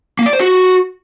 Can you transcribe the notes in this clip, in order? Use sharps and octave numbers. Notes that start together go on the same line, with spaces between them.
A#3
D5
C5
F#4